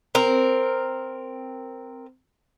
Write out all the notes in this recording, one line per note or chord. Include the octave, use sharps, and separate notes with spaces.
C4 A#4